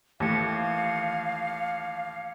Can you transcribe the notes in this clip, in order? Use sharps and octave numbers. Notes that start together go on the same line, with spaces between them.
D#2 E3 A3 F5 D6 G#6 C#7